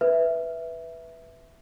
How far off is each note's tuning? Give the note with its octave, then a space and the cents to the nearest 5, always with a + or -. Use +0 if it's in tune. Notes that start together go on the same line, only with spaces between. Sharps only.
B4 +0 E5 +0